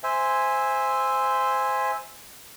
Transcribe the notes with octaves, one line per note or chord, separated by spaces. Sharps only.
C5 E5 G#5